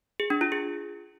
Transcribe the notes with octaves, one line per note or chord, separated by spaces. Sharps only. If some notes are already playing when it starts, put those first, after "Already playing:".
G#4
D4
F4
G#4